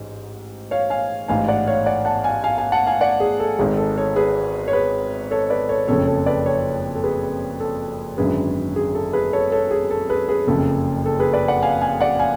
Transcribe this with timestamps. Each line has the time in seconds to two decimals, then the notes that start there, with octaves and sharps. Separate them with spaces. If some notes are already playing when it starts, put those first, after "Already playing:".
Already playing: A1 G#2
0.71 C#5 F5
0.90 F5 G#5
1.28 A1 G#2 F5 G#5
1.48 D5 F#5
1.67 C#5 F5
1.86 D5 F#5
2.05 F#5 A5
2.24 F5 G#5
2.44 F5 G#5
2.58 F5 G#5
2.72 F#5 A5
2.87 F5 G#5
3.01 D5 F#5
3.20 G#4
3.40 A4
3.59 G#1 G#2 G#4
3.77 A4
3.97 A4 C#5
4.16 G#4 B4
4.68 C#5
4.73 G#4 B4
5.31 A4 C#5
5.50 B4 D5
5.69 A4 C#5
5.88 F#1 F2 C#3 A4 C#5
6.08 A4 C#5
6.26 B4 D5
6.45 A4 C#5
6.95 A4
7.04 G#4 B4
7.60 A4
8.18 G#1 F#2 D3 G#4 B4
8.76 G#4
8.95 A4
9.13 G#4 B4
9.33 A4 C#5
9.52 A4 C#5
9.71 G#4
9.91 A4
10.10 G#4 B4
10.28 G#4 B4
10.47 F#1 F2 C#3 A4
11.06 A4
11.19 G#4 B4
11.33 B4 D5
11.48 D5 F#5
11.62 F5 G#5
11.81 F5 G#5
12.01 D5 F#5
12.20 F5 G#5